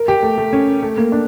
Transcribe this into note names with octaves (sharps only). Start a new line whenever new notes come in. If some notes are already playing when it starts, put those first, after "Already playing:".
Already playing: A#4
G4
A3
A3
C#4
A3
A#3
D4